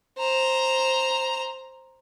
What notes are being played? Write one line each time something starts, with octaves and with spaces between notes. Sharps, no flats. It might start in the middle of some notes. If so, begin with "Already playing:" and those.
C5 A#5